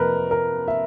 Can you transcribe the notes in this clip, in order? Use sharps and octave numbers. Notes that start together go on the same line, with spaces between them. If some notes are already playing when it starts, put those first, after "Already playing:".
Already playing: F2 C3 F3 A#3 A#4 B4
A#4
E5